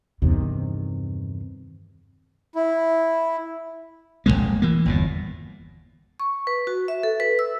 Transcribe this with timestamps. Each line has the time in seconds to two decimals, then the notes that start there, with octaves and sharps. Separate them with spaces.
0.22 E2 G2 C3 D#3
2.55 E4
4.26 F1 G2 G#3 A#3
4.62 E3 A#3
4.86 G1 E2 A#2
6.20 C#6
6.47 B4
6.67 F#4
6.88 E5
7.03 A4
7.20 B4
7.39 E6